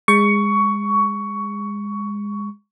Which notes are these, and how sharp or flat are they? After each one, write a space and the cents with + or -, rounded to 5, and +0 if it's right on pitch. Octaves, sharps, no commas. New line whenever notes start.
G#3 -20 C#6 +15